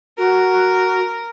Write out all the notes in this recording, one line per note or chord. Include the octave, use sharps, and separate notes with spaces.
F#4 A#4